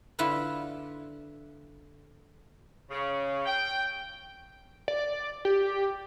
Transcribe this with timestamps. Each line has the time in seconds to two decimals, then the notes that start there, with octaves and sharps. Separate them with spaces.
0.19 D3 E4 F4 B4 B5
2.90 C#3
3.46 G5
4.88 D5
5.45 G4